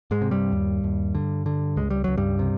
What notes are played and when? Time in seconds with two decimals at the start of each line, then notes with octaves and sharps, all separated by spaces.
0.11 G#2 G#3
0.22 C3
0.31 G2 G3
0.52 D#2
0.84 D#2
1.15 D3
1.46 D3
1.76 C#2 G#3
1.90 G3
2.04 C#2 F#3
2.17 G2 G3
2.39 C3